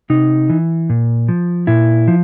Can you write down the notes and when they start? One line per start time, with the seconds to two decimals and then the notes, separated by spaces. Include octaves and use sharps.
0.10 C3 D#4
0.50 E3
0.90 A#2
1.28 F3
1.67 A#2 E4
2.08 F3